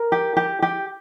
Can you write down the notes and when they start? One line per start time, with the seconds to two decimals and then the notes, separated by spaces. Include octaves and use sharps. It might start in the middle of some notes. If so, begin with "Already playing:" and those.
Already playing: A#4
0.12 G4
0.37 G4
0.62 G4